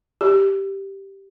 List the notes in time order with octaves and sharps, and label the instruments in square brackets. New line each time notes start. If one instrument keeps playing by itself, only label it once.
[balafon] G4